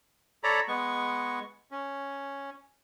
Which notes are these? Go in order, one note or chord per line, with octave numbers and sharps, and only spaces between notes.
A4 C#5 D5 A#5 B5
G#3 B3 C#6
C#4